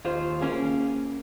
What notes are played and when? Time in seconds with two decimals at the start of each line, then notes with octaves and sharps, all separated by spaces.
0.04 D#2 F4 C5
0.41 A#3 C#4 G#4